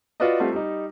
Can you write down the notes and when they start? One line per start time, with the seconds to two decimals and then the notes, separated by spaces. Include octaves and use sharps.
0.20 F4 F#4 B4 D5 D#5
0.40 G3 A3 C4 F4
0.52 G3 D#4